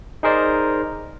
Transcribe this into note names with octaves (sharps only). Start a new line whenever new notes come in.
D#4 G#4 A#4 C5 D5 D#5